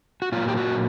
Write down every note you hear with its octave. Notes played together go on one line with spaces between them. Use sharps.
F#4
A#2 F#3 A#3 F4
G4
F#4